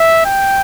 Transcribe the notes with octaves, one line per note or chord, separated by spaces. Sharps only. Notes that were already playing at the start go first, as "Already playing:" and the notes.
Already playing: E5
G5